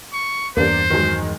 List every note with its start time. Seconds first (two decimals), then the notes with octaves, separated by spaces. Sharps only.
0.13 C#6
0.57 E2 G2 E3 A#3 D4 G4 C5
0.90 D#3 F#3 G#3